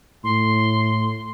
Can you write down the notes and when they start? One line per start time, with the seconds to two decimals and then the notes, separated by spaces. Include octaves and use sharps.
0.24 A2 C6